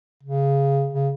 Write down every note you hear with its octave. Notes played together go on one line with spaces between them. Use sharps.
C#3
C#3